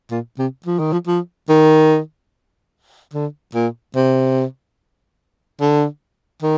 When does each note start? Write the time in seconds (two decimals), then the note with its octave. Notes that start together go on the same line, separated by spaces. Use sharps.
0.11 A#2
0.39 C3
0.66 F3
0.79 D#3
0.93 F3
1.07 F3
1.49 D#3
3.14 D3
3.55 A#2
3.96 C3
5.61 D3
6.43 D#3